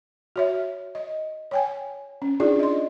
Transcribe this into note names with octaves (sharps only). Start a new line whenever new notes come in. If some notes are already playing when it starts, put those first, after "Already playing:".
F#4 C#5 E5
D#5
C#5 G5 G#5
C#4
D4 D#4 F4 G4 G#4 D5
D#5 C6